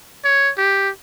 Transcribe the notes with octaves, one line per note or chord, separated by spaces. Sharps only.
C#5
G4